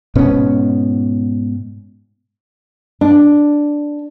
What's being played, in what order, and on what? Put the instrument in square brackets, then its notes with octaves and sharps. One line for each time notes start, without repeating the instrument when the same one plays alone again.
[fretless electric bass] G#2 B2 B3 C#4
[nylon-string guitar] D4